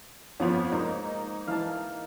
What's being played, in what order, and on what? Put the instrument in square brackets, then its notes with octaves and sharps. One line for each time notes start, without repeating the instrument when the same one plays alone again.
[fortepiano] F2 [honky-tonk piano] F3 B3 C#4
[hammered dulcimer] G#2 [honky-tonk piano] A#3 D#4 [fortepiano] D#5
[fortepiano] E3 [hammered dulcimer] F5 A5